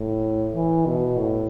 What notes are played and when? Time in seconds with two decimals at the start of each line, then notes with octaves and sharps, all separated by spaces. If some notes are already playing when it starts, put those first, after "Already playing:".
Already playing: A2
0.54 E3
0.86 B2
1.17 A2